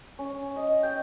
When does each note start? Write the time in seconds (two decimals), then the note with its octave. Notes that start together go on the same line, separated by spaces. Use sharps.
0.19 C#4
0.56 D#5
0.83 G5